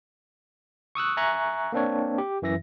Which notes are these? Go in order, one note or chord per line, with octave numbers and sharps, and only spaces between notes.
C#6 D#6 E6 F#6
E5 G#5 A#5 C#6 F#6
A#3 C4 D4 C#5
G4
F#2 E3 E5 A#6